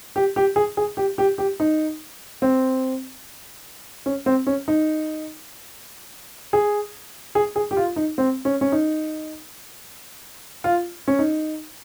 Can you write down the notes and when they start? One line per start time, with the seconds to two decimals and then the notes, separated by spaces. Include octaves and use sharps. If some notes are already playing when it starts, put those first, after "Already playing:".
0.16 G4
0.36 G4
0.56 G#4
0.77 G#4
0.97 G4
1.18 G4
1.38 G4
1.60 D#4
2.42 C4
4.06 C#4
4.26 C4
4.47 C#4
4.68 D#4
6.53 G#4
7.35 G#4
7.56 G#4
7.71 G4
7.77 F4
7.96 D#4
8.18 C4
8.45 C#4
8.61 C#4
8.72 D#4
10.64 F4
11.08 C#4
11.19 D#4